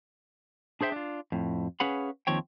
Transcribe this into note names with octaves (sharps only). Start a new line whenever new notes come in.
D4 G#4 C5 E5 G5
D4 F4
F2 A2
C#4 G#4 B4 F5 F#5 B5
D#2 D#3 F3 C4 C#5 G5